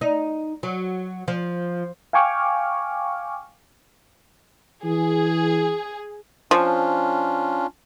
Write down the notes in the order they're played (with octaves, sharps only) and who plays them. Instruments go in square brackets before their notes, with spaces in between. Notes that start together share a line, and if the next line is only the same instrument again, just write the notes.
[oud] D#4
F#3
F3
[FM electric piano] F5 G5 G#5 C#6 D6 F6
[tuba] E3 [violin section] G#4
[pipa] F3 [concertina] C#4 D4 F4